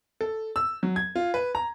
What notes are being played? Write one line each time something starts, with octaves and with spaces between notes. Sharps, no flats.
A4
E6
F#3
G#6
F4
B4
A#5